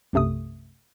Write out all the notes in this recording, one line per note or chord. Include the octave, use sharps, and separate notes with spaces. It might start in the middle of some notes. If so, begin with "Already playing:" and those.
B1 F#2 C3 A3 D#6